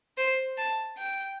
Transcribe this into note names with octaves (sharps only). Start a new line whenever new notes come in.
C5
A5
G5